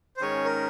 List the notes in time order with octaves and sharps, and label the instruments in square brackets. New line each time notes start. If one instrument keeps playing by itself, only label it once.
[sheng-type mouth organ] C5
[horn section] G#2 D#3 G#3 C#4 [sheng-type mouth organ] C#5
[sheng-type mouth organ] A#4